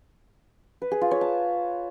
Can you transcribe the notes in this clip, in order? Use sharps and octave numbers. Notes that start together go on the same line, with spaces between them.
B4
G#4
F4
C#5
A5